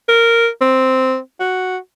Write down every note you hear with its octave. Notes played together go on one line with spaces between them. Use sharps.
A#4
C4
F#4